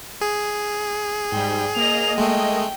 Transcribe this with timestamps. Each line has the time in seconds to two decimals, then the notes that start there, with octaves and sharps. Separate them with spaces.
0.21 G#4
1.32 G#2 G3 G5
1.76 A#3 D#5 F7
2.18 G#3 A3 G5